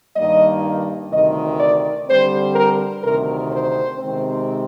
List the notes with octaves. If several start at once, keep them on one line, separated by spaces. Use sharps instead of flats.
G2 D#3 G3 A#3 D#5
D2 C3 D#3 D#5
D5
D3 G3 C4 C5
A#4
D2 C3 D#3 A#4
C5
C3 D#3 G#3 C4